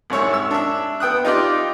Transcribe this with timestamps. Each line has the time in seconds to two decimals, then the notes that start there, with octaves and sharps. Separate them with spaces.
0.10 C2 G#2 C#5 E5
0.34 E6
0.51 D4 E5
1.00 B3 G5 D#6 F#6
1.25 D#4 F4 G4 D5